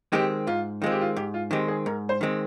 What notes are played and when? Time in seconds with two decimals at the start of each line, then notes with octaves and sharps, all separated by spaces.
0.12 D#3 G#3 C4 G4
0.47 G#2 F4
0.82 D#3 G#3 C4 F4
0.91 G4
1.01 F4
1.16 G#2 G4
1.34 F4
1.51 D#3 G#3 C4 G4
1.68 G#4
1.86 G#2 A#4
2.09 C5
2.21 D#3 G#3 C4